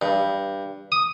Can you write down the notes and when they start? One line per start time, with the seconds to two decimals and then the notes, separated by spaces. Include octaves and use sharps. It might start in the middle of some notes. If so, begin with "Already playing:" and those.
0.02 G2
0.92 D#6